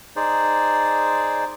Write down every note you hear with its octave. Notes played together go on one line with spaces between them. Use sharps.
D#4 G#4 C5 D5